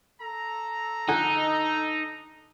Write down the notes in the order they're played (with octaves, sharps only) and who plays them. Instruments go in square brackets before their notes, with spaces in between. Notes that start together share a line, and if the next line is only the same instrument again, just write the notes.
[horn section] A4 A#5
[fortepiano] D3 F#5 G#5 [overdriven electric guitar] D#4